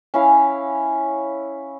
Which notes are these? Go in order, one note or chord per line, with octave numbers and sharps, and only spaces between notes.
C#4 E4 F5